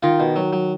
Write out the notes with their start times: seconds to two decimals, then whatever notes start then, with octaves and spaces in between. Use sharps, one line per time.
0.03 D#3 F4
0.20 B2
0.36 F#3
0.53 F#3